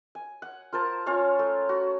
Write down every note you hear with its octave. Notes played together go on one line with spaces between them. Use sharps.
G#5
F#5
F4 A#4 C5 A5
C#4 F4 C#5 F5
A3
F#4